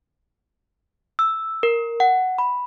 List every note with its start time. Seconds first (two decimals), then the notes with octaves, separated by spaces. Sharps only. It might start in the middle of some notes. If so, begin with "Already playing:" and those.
1.19 E6
1.63 A#4
2.00 F#5
2.38 B5